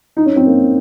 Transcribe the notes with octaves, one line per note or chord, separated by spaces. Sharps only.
D#4
C#4
C4
A#3